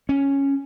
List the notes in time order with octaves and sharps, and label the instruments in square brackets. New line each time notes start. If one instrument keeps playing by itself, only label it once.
[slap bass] C#4